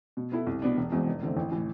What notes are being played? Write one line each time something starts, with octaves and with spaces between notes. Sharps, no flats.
B2
B3 E4 A4
C2
B2 B3 D4
E1
E2 B2 G#3 C4
F1
E2 D3 A3 C4
A1
A2 E3